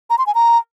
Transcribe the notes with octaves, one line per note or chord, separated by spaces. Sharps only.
A#5
C6
G#5
A#5